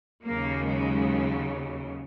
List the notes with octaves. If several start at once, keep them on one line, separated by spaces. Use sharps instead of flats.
D#2 C#3 F#3 A#3
G#3